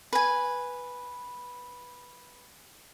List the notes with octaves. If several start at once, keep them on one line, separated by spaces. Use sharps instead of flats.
B4 G#5